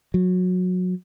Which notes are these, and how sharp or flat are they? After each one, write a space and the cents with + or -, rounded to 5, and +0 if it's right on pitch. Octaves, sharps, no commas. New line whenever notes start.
F#3 -20